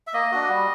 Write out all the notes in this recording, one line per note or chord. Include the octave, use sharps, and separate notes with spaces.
E5
A#3 D#5
D4 F#4
G3